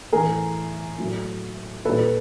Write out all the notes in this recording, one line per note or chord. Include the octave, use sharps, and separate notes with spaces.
A2 E3 A3 G#4 A#4
A2 F#3 A3
A#2 G3 A4 B4